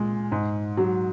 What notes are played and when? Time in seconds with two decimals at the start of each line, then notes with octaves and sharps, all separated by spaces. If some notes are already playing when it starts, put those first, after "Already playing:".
Already playing: A#2 G#3
0.32 G#2
0.77 F#3